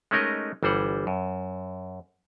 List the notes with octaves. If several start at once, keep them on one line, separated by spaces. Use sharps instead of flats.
G#3 A3 C#4 D#4 A#4 D#5
G1 E3 G3 C5 F#5
F#2